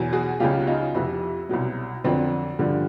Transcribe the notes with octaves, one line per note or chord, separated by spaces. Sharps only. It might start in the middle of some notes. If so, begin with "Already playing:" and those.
Already playing: E2 B2 F#3
F#4 G#4
C#2 C#3 F#3 F4 G4
F#4
D#4 F4
F2 C3 F3 E4 F#4
C2 B2 F#3
F2 D3 F#3 C4 D4
G2 D3 F3